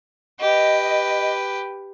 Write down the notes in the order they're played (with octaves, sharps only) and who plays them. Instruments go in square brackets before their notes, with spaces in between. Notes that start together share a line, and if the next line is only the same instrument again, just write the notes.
[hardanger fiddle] G4 B4 [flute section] D#5